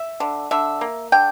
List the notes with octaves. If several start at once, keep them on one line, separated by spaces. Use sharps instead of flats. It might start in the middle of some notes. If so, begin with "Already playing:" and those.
Already playing: E5
D3
D3 E5
A#3
D3 G5